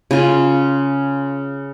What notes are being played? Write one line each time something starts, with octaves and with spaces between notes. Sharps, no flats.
C#3 F4